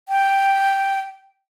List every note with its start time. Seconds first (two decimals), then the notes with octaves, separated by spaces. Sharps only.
0.09 G5